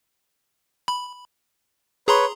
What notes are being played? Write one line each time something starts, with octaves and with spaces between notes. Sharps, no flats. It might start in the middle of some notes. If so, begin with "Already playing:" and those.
B5
G#4 B4 C#5 A#5 C6